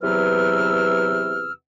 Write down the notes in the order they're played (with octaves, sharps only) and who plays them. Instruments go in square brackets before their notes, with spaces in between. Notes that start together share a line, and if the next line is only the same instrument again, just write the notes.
[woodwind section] E2 C3 F#3 B4 E6 F6